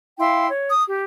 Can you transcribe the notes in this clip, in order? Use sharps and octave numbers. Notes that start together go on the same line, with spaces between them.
E4 F5 G5 C6
C#5
D#6
G4